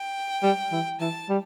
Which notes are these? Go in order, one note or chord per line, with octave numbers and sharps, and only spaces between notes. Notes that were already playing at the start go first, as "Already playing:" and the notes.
Already playing: G5
G3
E3
E3 A5
G3